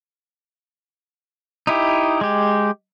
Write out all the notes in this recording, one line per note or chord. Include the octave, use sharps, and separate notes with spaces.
D#4 E4 G4
G#3 G4